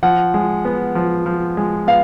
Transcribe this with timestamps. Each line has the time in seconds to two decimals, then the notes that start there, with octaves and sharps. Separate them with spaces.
0.03 F3 F#5
0.34 G#3
0.65 B3
0.95 F3
1.26 F3
1.57 G#3
1.87 B3 F5